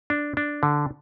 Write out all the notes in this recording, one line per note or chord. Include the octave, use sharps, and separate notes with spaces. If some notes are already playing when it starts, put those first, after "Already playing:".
D4
D4
D3